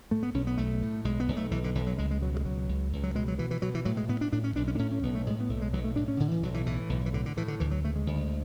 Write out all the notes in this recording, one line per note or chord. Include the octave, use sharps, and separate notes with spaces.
A2 A3
B3
B1 C#4
B3
B1 A3
A2
B1 G#3
B3
B1
A3
B1 E3
D3
B1 E3
F#3
C#2 G#3
G#3
B2 F#3
F#3
G#3
C#2 F#3
C#2
C#2
F#3
B2 G#3
F#3
B2 E3
E3
B2 F#3
E3
A2 F#3
G#3
A2 B3
D4
A2 D4
C#4
B1 D4
C#4
D4
A2 C#4
C#4
B1 B3
A3
A2 G#3
B3
B1 A3
G#3
B1 F#3
A3
A2 D4
C#4
A2 D3
E3
B1 F#3
E3
A2 E3
B1
E3
A2 D3
D3
A2 E3
D3
D2 E3
F#3
C#3 A3
G#3
D2